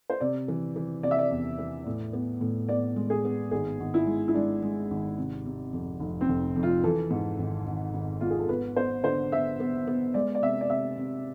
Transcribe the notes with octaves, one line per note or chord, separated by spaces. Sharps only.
C5
C3 D5
E3
E3
C3 D5
E5
D5
E2
E3
A2
B3
A2
B3 D5
G#3
G#4
B3
G#1 G#4
G#1
E4
G#3
E4
G#3 D4
G#3
G#1
C3
C3
F2
F1
C4
F1
F2
F4
E3 A4
G#2
G#1
G#1
G#1
G#2 F4
G#4
A4
B3 B4
B3 C5
D3 C5
B3 E5
B3
B3
G#3 D5
D5
C3 E5
D5
C3 E5
C3